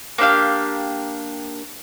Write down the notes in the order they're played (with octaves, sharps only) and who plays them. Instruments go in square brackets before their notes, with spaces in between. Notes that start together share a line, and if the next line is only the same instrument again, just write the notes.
[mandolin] A#3 D4 G4 F5